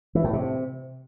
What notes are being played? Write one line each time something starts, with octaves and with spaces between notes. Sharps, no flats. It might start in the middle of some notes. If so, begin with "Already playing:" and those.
E3
A2
C3